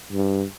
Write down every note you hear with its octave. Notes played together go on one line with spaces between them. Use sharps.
G2